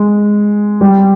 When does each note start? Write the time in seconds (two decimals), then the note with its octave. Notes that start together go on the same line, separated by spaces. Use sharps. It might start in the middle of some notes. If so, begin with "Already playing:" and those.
Already playing: G#3
0.81 G3